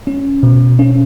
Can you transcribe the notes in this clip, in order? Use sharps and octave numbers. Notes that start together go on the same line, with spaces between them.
C#4
B2
C#4